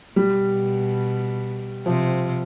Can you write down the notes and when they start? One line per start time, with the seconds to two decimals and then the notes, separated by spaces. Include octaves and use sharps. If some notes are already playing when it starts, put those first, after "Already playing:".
0.16 B2 G3
1.86 C3 F3